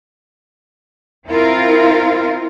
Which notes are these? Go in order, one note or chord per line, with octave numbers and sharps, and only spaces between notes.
C4 E4 F4 A#4